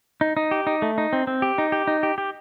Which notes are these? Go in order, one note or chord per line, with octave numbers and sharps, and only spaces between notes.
D#4
D#4
G4
D#4
A3
D#4
C4
C4
G4
D#4
G4
D#4
G4
G4